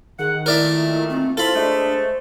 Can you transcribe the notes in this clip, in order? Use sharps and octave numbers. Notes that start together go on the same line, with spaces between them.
D#3 G#4 F#5
A#2 A3 E4 A#4 D5 E5
C4
E4 F4 A4 C5 B5
G#3 A3 D4